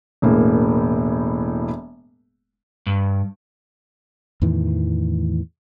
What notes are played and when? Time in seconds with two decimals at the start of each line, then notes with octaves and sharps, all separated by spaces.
0.22 E1 A2 A#3
2.87 G2
4.42 E2 A2 D#3 E3